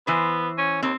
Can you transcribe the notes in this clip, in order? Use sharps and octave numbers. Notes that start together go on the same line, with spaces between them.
E3 B3 C5
C#4
D#2 C4